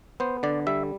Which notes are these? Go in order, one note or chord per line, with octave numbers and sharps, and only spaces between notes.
B3 C5
D3 D5
G3 E5